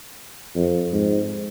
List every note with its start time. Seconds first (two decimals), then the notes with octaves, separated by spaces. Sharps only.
0.55 F2
0.93 G#2